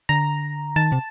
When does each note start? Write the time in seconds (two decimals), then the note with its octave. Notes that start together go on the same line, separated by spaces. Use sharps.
0.09 D3 A#5
0.76 D#3 A5
0.92 C3